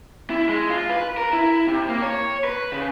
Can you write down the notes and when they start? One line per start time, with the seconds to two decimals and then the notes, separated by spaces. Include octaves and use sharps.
0.30 E4
0.49 G#3
0.70 F4
0.90 B4
1.17 A#4
1.33 E4
1.67 C3
1.88 A#3
2.02 C#5
2.44 B4
2.72 C#3